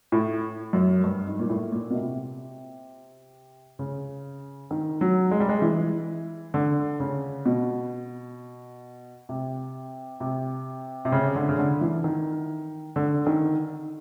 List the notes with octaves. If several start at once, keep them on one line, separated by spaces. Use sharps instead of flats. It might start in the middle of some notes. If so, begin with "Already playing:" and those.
A2
F#2
G2
G#2
A#2
A2
A#2
B2
C3
C#3
D#3
F#3
G#3
G3
G#3
E3
D3
C#3
B2
C3
C3
C3
C#3
D3
C#3
D3
E3
D#3
D3
D#3